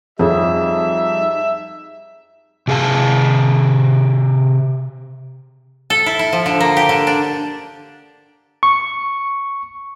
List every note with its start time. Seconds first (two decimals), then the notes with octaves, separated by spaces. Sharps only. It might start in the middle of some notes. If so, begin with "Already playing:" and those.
0.19 F2 G3 D#4 G#4 C#5 E5
2.67 C3 G#4 A4 F5 A5
5.90 A4
6.06 E4
6.19 E4
6.33 F3
6.46 D3
6.60 A#3
6.77 G4
6.89 D3
7.07 D4
8.63 C#6